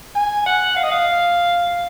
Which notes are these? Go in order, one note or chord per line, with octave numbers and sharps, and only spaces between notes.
G#5
F#5
F5
D#5
F5